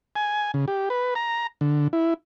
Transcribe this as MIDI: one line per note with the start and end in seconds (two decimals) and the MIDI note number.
0.16 0.51 80
0.54 0.65 49
0.68 0.89 67
0.90 1.14 71
1.15 1.47 82
1.61 1.88 50
1.93 2.14 64